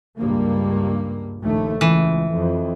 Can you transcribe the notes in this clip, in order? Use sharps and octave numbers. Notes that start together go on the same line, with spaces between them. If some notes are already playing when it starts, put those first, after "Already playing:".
C#2 G2 A#3
A#1 D#2 A3
C#2 E3
F2